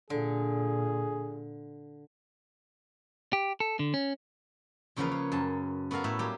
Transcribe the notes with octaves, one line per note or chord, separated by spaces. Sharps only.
A#2 D3 G#4
G4
A4
D3
C#4
E2 C#3 F3 A#3 B4 F5
C#5
F#2 A5
B3 F#4 A4 A#4 F5
A2 E5
F#3 G3 A#3 G4